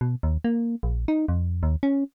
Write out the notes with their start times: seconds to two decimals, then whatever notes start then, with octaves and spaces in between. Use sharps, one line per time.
0.01 B2
0.23 D#2
0.44 A#3
0.83 A#1
1.08 D#4
1.28 F2
1.63 D#2
1.83 C#4